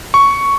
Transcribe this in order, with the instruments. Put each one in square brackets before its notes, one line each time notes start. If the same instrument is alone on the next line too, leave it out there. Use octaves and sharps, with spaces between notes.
[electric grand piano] C#6